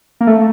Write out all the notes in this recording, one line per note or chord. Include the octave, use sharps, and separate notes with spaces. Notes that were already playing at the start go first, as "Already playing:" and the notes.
A#3
A3